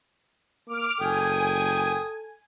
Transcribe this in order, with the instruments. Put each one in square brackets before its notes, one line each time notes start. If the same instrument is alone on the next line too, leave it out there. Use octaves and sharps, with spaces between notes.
[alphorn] A#3 [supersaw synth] D6 F6
[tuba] F#1 [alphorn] A4 [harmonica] G5 D#6 [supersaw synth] G#5